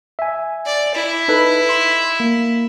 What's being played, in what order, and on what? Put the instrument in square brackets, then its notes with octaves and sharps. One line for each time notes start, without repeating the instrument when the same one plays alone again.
[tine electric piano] E5 G#5
[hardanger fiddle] D5
E4
[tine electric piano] D#4 A4 B4
C6
A#3